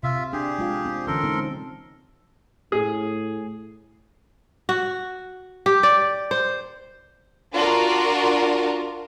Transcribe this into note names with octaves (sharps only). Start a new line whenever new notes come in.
C3 F4 E5
D4 G4 G#4
G#3 F4 F5
C4
D3 E3 C#4 A4 A#4 C6
G#3 C4 D#4
A2 G#4
F#4
G4
D5
C5
D4 F4 F#4 A#4